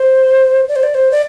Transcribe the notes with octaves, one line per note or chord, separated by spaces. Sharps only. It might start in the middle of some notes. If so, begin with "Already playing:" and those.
Already playing: C5
D5
C5
D5
C5
D5